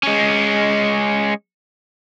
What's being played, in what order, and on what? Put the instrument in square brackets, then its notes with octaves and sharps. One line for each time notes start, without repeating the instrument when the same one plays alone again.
[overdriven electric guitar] G#3 C#4